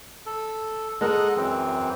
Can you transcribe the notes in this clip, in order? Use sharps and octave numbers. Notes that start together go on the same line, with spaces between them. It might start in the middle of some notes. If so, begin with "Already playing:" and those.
A4
G#3 A4 A#4 D#5 F#5
F#2 E3 C4